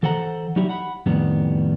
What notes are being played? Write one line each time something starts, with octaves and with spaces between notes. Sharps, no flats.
E3 A4 C5 F#5 A#5
F#3 G3 D#4 E4 G4
F#5 B5
F2 A2 D#3 G3 B3